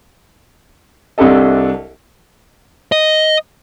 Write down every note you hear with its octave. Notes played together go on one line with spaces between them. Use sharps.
C2 C3 D4 G4 A4 D#5
D#5